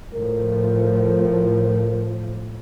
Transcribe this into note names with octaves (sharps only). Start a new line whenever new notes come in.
A2 F3 A#4